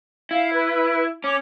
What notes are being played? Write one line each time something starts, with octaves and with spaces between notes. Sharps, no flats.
E4 F5
B4
C#4 D6